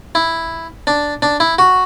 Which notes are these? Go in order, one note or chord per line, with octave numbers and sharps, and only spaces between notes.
E4
D4
D4
E4
F#4